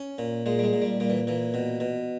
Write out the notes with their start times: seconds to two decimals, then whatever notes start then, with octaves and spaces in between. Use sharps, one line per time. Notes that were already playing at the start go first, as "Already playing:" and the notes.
Already playing: C#4
0.18 A#2
0.46 A#2 G#3
0.59 G3
0.64 G#3
0.73 A#2
0.82 G3
1.00 A#2 G3
1.10 E3
1.27 A#2 E3
1.54 B2
1.80 B2